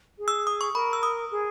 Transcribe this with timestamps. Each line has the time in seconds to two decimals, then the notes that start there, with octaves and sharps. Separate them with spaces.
0.19 G#4
0.28 E6
0.47 D#6
0.61 C#6
0.74 A#4 B5
0.93 E6
1.03 D#6
1.31 G#4